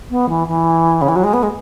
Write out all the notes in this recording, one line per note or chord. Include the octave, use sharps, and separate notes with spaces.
B3
E3
E3
C#3
E3
F#3
G#3
B3
G#3